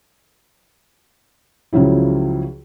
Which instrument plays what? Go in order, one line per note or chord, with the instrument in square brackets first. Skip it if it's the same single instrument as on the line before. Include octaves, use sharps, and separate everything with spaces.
[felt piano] C#2 C#3 F3 F#3 E4